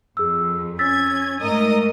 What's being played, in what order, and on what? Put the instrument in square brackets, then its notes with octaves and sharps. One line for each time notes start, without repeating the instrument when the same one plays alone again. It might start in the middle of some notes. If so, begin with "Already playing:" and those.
[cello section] F2 [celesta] G#4 E6
[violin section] C#4 G#6 [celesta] E6 A6 B6
[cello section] G#2 A3 [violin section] A#4 D#5 D#6